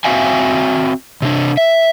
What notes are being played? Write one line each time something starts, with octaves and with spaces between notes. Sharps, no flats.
C4 F#4 E5 F5 G#5
C3 D4
E5